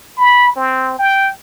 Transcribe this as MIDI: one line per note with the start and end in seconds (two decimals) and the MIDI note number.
0.18 0.55 83
0.56 0.94 60
0.99 1.32 79